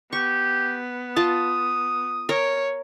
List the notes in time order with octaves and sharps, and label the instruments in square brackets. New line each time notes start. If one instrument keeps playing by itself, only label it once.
[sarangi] B3 [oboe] G4 [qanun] C#6
[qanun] F4 A5 [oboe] D#6
[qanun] A#4 [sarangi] C#5